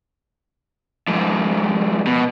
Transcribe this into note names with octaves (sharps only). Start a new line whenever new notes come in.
F2 G#2
B2